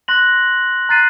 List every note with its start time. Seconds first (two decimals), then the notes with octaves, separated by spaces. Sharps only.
0.08 C6 F#6 A#6 F#7
0.89 A#5 F#6 A6 C7 D#7